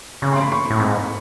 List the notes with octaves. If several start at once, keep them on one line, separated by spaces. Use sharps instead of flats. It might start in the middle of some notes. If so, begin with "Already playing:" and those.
C#3 C#6
C6
B5
C#6
A2
G#2